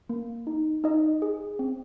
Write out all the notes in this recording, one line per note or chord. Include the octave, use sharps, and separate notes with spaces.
A#3
D#4
D#4 D#5
G#4
C4